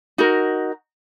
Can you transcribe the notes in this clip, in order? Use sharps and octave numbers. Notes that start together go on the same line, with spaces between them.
D#4 F#4 A#4